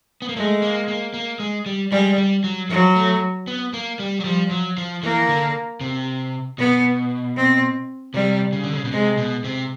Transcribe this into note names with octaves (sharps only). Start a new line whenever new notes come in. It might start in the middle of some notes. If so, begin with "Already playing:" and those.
B3
A#3
G#3 A3
A#3
A#3
A#3
G#3
G3
G3 G#3
G3
F#3
F3 F#3
A3
B3
A#3
G3
F#3
F3 G3
F#3
F3
E3 A#3
D3
C3
B2 B3
C4
C3 G3
C#3
D3
C#3
B2
C3 G#3
B2
C3